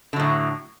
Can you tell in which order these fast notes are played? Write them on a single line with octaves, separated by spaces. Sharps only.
D3 F#3 A2